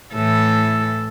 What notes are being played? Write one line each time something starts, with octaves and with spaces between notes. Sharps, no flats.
A2 E3 A4